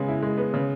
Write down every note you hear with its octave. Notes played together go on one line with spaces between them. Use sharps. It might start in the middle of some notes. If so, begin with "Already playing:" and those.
Already playing: C#3 G#3 B3
E4
G#3
B3
C#3